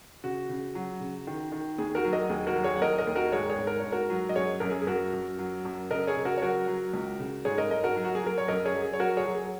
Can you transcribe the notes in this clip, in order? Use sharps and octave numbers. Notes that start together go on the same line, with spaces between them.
C#3 F#4
C#3
F#3
C#3
D#3
D#3
D#2 G#4
F#4 A#4
F#3
A#4 D#5
D#2 G#4
F#4 A#4
F#3
G#4 C#5
F#5
D#2 A#4 D#5
A#4 D#5
D#2
F#4 A#4
G#2 G#4 C#5
G#4 C#5
G#2
A#4
G#2 C#5
F#4 A#4
F#3
D#5
F#2 G#4 C#5
F#2 A#4
G#4
G#4
F#2 F#4 A#4
F#2
F#3
F#2
C#3 A#4 D#5
G#4 C#5
C#3
F#4 A#4
C#5
F#3 F#4 A#4
F#3
C#2
C#3
G#2 G#4 C#5
A#4 D#5
G#2 A#4 D#5
F#4 A#4
F#3
F#4
G#4
F#3 A#4
C#5
F#2 A#4 D#5
G#4 C#5
F#3
G#4
C#5
F#3 F#4 A#4
G#4 C#5
F#3
G#4